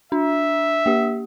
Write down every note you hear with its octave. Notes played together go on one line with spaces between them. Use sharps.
D4 E5
A#3 G4